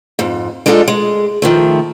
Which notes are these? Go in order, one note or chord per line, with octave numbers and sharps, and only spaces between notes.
F2 G#2
G#3 D4 D#4 F4 G4 A4
G#3
D#3 F3 A3